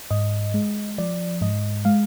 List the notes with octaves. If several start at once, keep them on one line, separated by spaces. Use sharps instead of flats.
G#2 D#5
G#3
F3 D5
G#2 D#5
G#3 F5